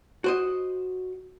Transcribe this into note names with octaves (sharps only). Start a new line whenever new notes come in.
F#4 C5 D#5